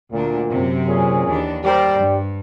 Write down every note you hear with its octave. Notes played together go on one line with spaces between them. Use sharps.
D2 A#2 D4
F#2 C3 C4
A#2 C#4 G#4
D#2 E3 D4
G3 G4 A#4 C5 D5
G2